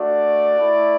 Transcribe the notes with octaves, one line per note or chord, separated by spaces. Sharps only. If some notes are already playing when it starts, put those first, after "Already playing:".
Already playing: A3 D4 F#4 D5
A3 E4